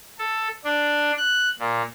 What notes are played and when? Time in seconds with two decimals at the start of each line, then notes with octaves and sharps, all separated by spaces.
0.19 A4
0.64 D4
1.17 F#6
1.59 A#2